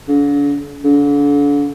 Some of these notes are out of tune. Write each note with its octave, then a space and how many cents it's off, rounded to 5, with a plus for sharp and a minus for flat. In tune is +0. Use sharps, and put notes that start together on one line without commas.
D3 -45
D3 -40